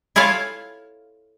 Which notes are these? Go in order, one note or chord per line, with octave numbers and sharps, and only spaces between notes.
E4 F4 A4 C#5 F5